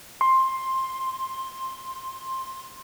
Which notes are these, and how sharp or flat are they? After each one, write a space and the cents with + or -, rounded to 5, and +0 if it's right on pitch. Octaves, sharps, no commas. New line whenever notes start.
C6 +10